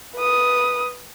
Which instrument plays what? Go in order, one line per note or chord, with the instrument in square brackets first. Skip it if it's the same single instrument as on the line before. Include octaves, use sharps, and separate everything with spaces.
[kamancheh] B4 D#6